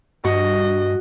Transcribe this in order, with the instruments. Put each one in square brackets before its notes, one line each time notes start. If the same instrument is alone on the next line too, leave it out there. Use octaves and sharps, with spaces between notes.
[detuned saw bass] G2 [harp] F#4 [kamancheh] D#5